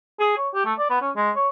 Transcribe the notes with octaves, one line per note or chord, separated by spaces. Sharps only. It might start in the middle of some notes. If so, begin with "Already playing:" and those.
G#4
C#5
G4
A3
D5
B3
C#4
G#3
C#5